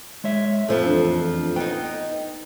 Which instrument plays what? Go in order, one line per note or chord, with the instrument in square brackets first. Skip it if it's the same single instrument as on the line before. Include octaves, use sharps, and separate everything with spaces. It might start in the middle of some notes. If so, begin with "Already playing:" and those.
[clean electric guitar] G#3 C#5 E5
[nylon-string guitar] F2 F3 A3 [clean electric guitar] A2 A4
[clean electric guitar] E2 D4
[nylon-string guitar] B3 D#4 [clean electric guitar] G5